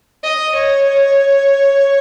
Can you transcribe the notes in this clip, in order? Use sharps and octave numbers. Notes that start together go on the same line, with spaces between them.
D#5
C#5